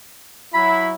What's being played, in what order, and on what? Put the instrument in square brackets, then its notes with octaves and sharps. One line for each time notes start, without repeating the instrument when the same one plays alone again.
[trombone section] F#3 E4 [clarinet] B5